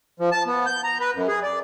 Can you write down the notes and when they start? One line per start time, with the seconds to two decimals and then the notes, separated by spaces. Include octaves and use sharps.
0.20 F3
0.32 A5
0.47 B3
0.66 G6
0.84 A#5
1.00 B4
1.15 F#2
1.28 G#4
1.43 D5